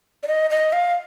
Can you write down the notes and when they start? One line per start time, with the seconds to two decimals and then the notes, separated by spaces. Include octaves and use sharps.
0.23 D5
0.28 D#5
0.50 D#5
0.73 F5